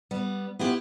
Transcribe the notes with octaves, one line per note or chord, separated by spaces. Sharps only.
G3 B3
B3 E4 F4 G4